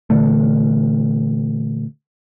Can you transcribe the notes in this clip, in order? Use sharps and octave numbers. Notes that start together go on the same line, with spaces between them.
A#2 D3 E3 A3